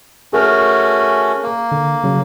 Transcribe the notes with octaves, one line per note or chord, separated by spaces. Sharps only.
A3 C#4 F#4 G#4 A#4 F6
A#3
D3
C#3 F#3